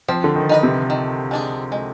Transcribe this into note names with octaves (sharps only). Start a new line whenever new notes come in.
F3 C4
D3
D#3
D#4 B4 D#5
C3
D#3
G#3 D4 G#4
G#3